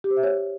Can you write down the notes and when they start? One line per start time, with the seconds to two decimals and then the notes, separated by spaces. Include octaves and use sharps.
0.04 G4
0.11 C5
0.17 E5
0.23 C#5